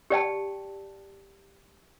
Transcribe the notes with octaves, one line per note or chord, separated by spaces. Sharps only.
G4 D5 G5 A5